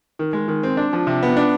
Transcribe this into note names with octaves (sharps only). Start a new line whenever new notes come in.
D#3
G#3
D#3
C4
D4
F3
C3
B3
D4